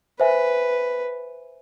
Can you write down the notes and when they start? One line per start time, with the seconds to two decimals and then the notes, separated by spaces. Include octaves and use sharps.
0.20 B4 C5 E5 G#5